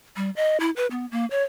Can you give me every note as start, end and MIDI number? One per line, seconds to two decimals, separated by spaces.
0.16 0.30 55
0.36 0.57 75
0.60 0.70 64
0.76 0.86 71
0.91 1.06 59
1.11 1.25 58
1.31 1.43 73